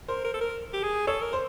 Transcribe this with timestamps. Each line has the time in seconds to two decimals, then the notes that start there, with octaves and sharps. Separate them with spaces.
0.08 A#4 C5
0.25 A#4
0.34 A4
0.41 A#4
0.73 G4
0.83 G#4
1.07 A4 C#5
1.21 A#4
1.33 C5